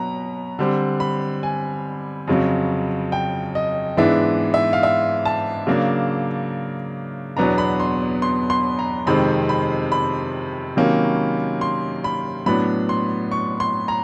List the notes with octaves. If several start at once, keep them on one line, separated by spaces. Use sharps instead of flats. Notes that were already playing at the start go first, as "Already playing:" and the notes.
Already playing: B2 F#3 B3 A#5
D3 G3 C4
B5
G#5
F2 C#3 F#3
G5
D#5
G#2 E3 G#3 B3 D4 E5
E5
F5
E5
A5
C#3 F#3 A#3 D4
E2 B2 F#3 B3 D4 A#5
B5
C6
C6
C6
A#5
F2 C3 D#3 G#3 C4 B5
B5
B5
C3 D#3 F#3 A#3 C#4
C6
B5
A2 F#3 B3 D4 B5
C6
C#6
C6
A#5